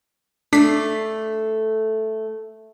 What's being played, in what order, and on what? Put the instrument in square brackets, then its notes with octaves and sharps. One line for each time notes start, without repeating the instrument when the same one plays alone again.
[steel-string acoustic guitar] A3 A4 [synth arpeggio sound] D4 B6 C7